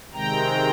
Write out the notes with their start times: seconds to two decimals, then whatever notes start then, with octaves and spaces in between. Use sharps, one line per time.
0.13 C3 D#3 G#3 C4 G5 A#5